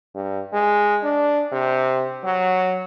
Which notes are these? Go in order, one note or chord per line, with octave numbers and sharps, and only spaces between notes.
G2
G#3
D4
C3
F#3